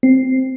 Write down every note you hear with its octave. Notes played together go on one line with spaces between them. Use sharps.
C4